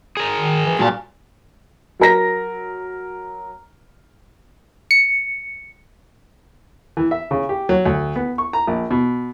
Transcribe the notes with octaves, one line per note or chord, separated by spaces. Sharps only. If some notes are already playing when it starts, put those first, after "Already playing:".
G#4 A#4
D#3
E3
G2 A#2 F#4 A5
F#3 A#4 A#6
C#7
E3
E5
C#3
G4
F#3
D2
B3
C#6
A#5
A#1
B2